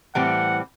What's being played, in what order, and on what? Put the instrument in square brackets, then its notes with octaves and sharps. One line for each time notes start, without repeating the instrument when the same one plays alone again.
[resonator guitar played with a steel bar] A2 E3 G3 C4 [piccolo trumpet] F#5